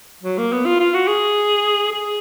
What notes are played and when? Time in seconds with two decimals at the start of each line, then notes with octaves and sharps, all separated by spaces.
0.23 F#3
0.38 A#3
0.52 B3
0.66 F4
0.80 F4
0.94 F#4
1.07 G#4
1.92 G#4